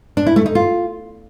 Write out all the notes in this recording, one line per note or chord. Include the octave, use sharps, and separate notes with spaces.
D4
E4
A3
D#4
F4